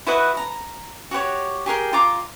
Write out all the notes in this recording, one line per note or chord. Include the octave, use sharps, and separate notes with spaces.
E4 F#4 B4 D#5
A#5
F#4 G4 C5 C#5
G4 G#4 A#4 G5
F4 A#5 D6